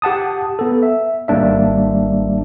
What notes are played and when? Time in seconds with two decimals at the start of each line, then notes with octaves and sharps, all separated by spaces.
0.02 G4 F#5 A5 D#6
0.59 B3 A4
0.83 E5
1.28 G#1 G3 A#3 D4 E5